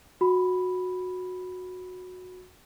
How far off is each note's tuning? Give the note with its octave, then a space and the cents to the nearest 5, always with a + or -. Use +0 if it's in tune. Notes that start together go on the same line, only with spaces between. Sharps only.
F#4 -15 B5 +0